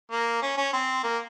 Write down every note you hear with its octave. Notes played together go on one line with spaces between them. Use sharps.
A#3
C#4
C#4
C4
A#3